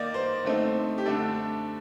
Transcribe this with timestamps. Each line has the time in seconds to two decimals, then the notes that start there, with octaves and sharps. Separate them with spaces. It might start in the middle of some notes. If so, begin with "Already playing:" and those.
Already playing: D#3 A#3 D#4 D5
0.14 C5
0.45 D3 A3 C4 D#4
0.98 G4
1.06 D3 A3 D4 A4